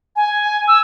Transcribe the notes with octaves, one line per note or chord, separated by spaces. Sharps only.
G#5
E6